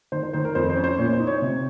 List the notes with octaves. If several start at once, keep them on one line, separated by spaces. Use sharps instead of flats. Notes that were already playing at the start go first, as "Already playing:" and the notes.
D#3 C5
C5
D#3 C5
A#4
F2 C5
C5
C#4
C5
A#2 C#5
C5
D#4
C#5
C3